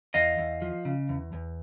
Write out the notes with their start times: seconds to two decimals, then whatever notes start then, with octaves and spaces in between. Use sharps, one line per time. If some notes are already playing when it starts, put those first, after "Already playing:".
0.14 E2 D#5 F5
0.38 E2
0.62 F3
0.85 C#3
1.09 E2
1.33 E2